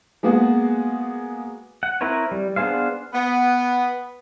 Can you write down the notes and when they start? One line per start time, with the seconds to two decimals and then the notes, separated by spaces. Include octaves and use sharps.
0.23 G#3 A#3 B3 F#4 G#4
1.83 F#5
2.01 C4 E4 A#4 B4 C#5
2.31 G3
2.56 B3 D4 G#4 C5 F5
3.13 B3